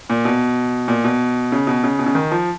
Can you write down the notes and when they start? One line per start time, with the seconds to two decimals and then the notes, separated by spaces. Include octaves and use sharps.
0.10 A#2
0.25 B2
0.88 A#2
1.04 B2
1.52 C#3
1.67 B2
1.83 C#3
1.99 B2
2.06 C#3
2.15 D#3
2.31 F3